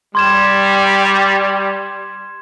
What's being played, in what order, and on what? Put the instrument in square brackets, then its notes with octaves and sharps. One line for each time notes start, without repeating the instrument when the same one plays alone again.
[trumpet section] G3 [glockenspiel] C6 G#6 E7